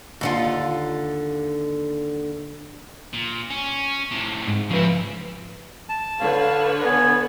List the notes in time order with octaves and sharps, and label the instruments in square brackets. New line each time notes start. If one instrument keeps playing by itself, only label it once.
[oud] D#2 D3 F4
[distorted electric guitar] A#2
C#4
A2 C3
[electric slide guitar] G#2
[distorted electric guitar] C#3 C4 [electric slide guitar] F3 B4
[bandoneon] A5
[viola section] D3 B4 C#5 [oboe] F5
[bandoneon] B3 [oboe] G#5